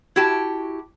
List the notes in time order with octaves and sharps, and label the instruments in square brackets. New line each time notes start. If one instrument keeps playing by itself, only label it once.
[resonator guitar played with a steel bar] E4 F#4 G4 A5